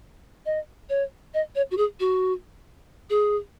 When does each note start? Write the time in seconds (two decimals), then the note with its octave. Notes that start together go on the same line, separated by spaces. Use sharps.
0.46 D#5
0.90 C#5
1.34 D#5
1.55 C#5
1.71 F#4
1.77 G#4
2.00 F#4
3.10 G#4